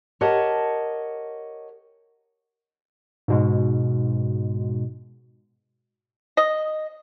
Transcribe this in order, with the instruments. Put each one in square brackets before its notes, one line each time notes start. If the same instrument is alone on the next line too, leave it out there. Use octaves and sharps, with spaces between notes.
[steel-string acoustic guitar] G4 A#4 C#5 D#5 F#5 A5
[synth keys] G#2 B2 G#3
[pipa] D#5